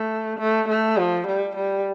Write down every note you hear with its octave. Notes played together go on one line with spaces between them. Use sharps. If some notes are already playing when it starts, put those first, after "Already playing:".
Already playing: A3
A3
A3
F3
G3
G3